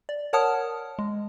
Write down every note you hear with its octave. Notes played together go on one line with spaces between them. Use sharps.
D5
A#4 C#5 F#5 A5 D#6 F6
G#3